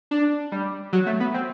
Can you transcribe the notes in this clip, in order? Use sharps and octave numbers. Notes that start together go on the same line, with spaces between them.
D4
G3
F#3
A3
B3
C4